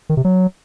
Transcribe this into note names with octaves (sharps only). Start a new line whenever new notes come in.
D#3
C3
F#3